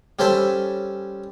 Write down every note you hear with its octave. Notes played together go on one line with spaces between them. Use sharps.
G3 C#4 A4 C5 E5